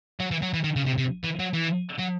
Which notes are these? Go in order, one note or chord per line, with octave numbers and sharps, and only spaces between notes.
F#3
E3
F#3
E3
D#3
C#3
C3
C3
E3
F#3
E3
F#3